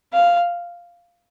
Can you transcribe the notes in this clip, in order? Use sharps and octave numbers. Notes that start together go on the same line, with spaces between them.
F5